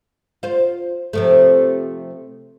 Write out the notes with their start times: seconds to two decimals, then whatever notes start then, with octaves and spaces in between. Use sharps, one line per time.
0.43 F4 C5
1.13 C3 F3 A3